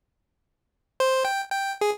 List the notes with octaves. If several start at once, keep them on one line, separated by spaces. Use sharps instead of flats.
C5
G5
G5
G#4